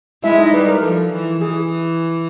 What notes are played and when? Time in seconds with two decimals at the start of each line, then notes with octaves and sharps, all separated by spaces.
0.24 G#3 E4 E5
0.38 D#4 D#5
0.53 G3 B4
0.68 A#4
0.82 F3 A4
1.11 E3
1.41 E3 G#4